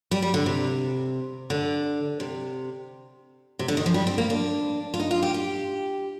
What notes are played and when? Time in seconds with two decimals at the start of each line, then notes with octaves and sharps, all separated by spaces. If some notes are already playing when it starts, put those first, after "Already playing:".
0.11 G3
0.22 G3
0.34 D3
0.46 C3
1.50 D3
2.20 C3
3.59 C3
3.68 D3
3.77 D#3
3.86 F3
3.94 G3
4.07 C4
4.18 A#3
4.30 D4
4.94 F4
5.00 D#4
5.11 F4
5.23 G4
5.34 G4